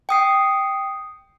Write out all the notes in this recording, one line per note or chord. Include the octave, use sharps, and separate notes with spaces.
G5 D#6 C7